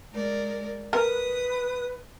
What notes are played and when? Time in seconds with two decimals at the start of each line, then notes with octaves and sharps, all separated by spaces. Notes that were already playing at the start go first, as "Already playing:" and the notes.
0.13 G#3 A#4 D5
0.93 A#4 B4 D#6